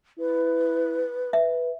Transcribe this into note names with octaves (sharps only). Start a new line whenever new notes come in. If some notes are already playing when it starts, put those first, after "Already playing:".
E4 B4
B4 E5